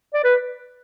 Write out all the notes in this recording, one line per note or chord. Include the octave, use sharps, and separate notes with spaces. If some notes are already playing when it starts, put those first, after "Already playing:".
D5
B4